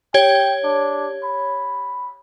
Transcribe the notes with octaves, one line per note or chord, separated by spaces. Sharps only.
G4 C#5 G5 G#6
D4
B5